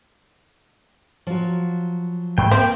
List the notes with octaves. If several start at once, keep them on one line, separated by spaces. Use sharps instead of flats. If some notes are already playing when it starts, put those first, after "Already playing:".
F3 F#3
G#2 G5
A#3 C4